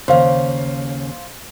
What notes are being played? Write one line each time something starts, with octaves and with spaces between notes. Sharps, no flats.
D#2 C#3 C5 F5